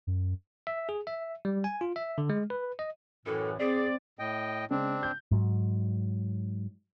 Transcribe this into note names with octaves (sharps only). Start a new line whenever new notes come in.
F#2
E5
G#4
E5
G3
G#5
F4
E5
D3
G#3
B4
D#5
F#2 A2 E3 A4
C4 G#4 D5
A2 D#5 G5
C#3 G#3 C4 D4
G6
G#2 F#3